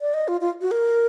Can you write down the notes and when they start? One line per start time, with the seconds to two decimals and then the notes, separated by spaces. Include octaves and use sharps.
0.01 D5
0.14 D#5
0.28 F4
0.41 F4
0.61 F#4
0.71 A#4